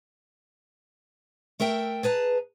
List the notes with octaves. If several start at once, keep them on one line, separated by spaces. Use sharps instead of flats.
A3 A#4 E5 G5
G#4 B4 A5 A#5